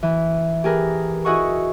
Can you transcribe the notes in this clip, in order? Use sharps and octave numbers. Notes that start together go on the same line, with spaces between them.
E3
G4 G#4 A#4 B4
E4 F#4 G#4 D#5 F#5 C#6